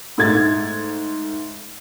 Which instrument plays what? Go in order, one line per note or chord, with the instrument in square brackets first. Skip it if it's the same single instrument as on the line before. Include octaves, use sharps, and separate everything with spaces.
[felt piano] G#2 A3 G#6 A6